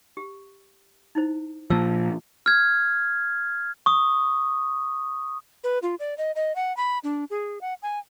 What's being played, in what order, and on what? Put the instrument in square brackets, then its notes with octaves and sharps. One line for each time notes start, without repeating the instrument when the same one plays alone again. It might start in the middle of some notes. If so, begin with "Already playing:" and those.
[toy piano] G4
D#4 E4 C5
[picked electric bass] A#2 F3 [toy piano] A5 E6
[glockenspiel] F6 G#6
C#6 D#6
[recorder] B4
F4
D5
D#5
D#5
F#5
B5
D4
G#4
F#5
G#5